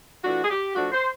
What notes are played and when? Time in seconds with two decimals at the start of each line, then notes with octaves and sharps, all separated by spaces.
0.23 E3 A3 D4 F4 F#4
0.44 G#4
0.50 G4
0.75 F3 A3 D4 F#4
0.92 C5